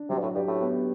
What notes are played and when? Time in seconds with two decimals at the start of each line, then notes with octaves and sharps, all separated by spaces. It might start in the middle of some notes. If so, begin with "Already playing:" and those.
Already playing: D4
0.09 C3 F#3
0.18 G2
0.22 A2
0.35 G2 G4
0.48 A2
0.61 B3